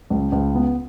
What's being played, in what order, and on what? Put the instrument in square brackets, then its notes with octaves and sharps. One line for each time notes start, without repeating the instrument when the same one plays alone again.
[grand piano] C#2
C#2
B3